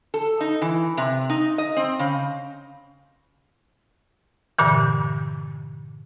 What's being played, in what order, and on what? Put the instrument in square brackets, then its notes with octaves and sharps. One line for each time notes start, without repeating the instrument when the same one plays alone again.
[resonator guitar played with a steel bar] A4
D#4
E3
C3
D#4
D#5
C4
C#3
[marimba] G2 A#2 D3 E3